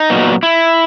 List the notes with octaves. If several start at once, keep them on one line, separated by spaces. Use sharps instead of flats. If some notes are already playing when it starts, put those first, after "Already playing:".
Already playing: D#4
A#2 F#3 B3
E4